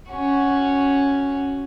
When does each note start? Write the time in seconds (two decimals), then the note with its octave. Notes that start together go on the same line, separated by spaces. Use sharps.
0.12 C#4 F#4